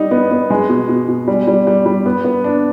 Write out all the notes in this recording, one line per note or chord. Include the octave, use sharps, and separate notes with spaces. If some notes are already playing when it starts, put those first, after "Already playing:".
Already playing: G3 D#4
B3
B3
G#3
B2
B2
B2
G3
G3
G3
G3
B3
B3
D4